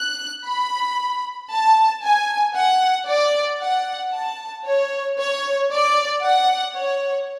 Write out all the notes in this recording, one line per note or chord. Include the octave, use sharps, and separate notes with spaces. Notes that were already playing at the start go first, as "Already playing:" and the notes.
Already playing: F#6
B5
A5
G#5
F#5
D5
F#5
A5
C#5
C#5
D5
F#5
C#5